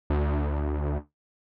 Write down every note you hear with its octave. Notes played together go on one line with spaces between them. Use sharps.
D2